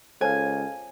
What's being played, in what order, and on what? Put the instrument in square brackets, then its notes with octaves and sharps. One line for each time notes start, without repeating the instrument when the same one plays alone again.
[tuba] C#2 [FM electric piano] A4 F5 [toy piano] C5 C#5 [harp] G#5